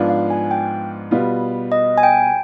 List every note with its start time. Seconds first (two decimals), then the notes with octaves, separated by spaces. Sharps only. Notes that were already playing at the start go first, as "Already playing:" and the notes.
Already playing: G#2 F3 B3 D4 F4
0.09 F5
0.30 G#5
0.51 G5
1.11 B2 G3 B3 F4
1.72 D#5
1.98 G#5
2.03 G5